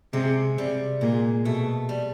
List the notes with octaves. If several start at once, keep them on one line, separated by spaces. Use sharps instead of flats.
C3 G#3
C3 G3
A#2 G#3
B2 A3
G3